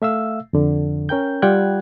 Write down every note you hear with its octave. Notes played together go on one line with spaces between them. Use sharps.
A3 E5 F5 E6
F2 D3
C#4 A#4 G5 G6
G3 F4 F#5 G5 F#6 G#6